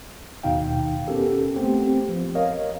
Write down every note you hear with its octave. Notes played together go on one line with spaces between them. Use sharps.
D#2 B2 D#3 D#4 F5 G5
B3 C#4 G4 A4 A#4
A3 B3 C4 G4
F3
A#4 C#5 D#5 F5